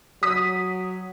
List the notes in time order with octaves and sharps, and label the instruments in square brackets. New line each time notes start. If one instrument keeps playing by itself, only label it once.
[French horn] F#3 [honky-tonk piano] D#6 B6